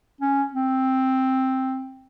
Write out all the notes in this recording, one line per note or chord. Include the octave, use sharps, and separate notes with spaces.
C#4
C4